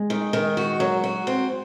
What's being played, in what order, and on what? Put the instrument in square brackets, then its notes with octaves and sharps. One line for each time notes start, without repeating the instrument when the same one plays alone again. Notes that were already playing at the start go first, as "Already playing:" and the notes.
Already playing: [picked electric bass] G#3
[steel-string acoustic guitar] D#3
D#3
F#4
F#3
F#4
C4